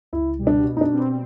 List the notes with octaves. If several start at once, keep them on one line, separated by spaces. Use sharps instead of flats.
C#2 E4
B2 G3
D4
B2
D#4
D4
G3 C4